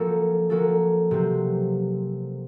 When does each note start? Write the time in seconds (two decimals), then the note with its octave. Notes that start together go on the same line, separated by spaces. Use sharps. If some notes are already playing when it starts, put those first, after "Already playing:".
Already playing: F3 A#3 C#4 F#4 A4
0.50 F3 A#3 C#4 F#4 A4
1.11 C3 F#3 C4